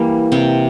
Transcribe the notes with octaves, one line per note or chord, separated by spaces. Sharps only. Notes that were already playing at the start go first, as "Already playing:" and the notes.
Already playing: E3 G3 A#3
C3 C4